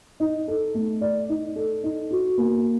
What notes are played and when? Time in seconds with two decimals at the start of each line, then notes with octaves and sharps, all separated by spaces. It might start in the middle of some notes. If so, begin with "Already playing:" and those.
0.20 D#4
0.48 A4
0.75 A3
1.01 D5
1.29 D#4
1.56 A4
1.83 D#4
2.11 F#4
2.38 A#3